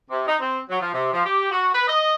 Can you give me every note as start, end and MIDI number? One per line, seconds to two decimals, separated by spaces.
0.10 0.23 48
0.27 0.35 63
0.40 0.59 60
0.69 0.79 54
0.80 0.91 53
0.93 1.12 48
1.12 1.24 53
1.25 1.46 67
1.51 1.69 66
1.73 1.86 71
1.87 2.15 75